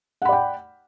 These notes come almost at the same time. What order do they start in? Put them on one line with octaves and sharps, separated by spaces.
F#5 B5 D5 G5